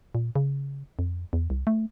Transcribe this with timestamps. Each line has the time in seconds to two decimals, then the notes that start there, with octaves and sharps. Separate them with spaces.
0.15 A#2
0.36 C#3
0.99 F2
1.33 E2
1.50 C2
1.67 A3